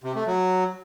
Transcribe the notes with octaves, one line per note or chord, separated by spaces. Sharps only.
C3
A3
F#3